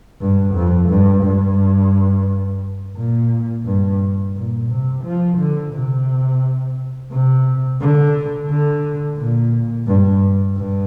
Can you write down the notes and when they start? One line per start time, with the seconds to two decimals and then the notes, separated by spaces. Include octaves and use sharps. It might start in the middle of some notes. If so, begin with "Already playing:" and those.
0.21 G2
0.55 F2
0.89 G2
1.24 G2
2.96 A#2
3.66 G2
4.35 A#2
4.69 C3
5.04 F3
5.38 D3
5.73 C3
7.11 C3
7.80 D3
8.50 D3
9.19 A#2
9.87 G2
10.57 G2